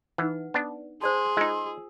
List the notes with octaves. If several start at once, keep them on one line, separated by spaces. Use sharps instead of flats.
E3 D#4 B4 F#5
B3 D4
G#4 C5 D5 A5 C6
G#3 D#4 F4 E6